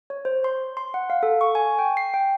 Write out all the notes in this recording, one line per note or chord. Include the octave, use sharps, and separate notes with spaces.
C#5
C5
C6
C6
F#5
F5
A4
C#6
G#5
G5
C7
G5